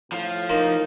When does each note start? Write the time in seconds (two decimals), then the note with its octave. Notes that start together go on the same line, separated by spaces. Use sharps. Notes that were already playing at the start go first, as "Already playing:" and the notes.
0.12 A2 F3
0.49 A#3 D#4 C5 A#5